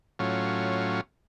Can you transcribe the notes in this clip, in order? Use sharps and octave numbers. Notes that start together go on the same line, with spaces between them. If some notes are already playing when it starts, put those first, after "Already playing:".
A2 F#3 C#4 F4